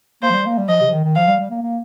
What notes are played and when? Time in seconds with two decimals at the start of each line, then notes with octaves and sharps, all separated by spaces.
0.23 A#3 C5
0.30 F3
0.34 G3
0.46 A#3
0.58 G3
0.69 F3 D#5
0.81 C3
0.88 F3
0.93 D#3
1.05 D#3
1.16 F3 F5
1.28 G3
1.40 G3
1.51 A#3
1.62 A#3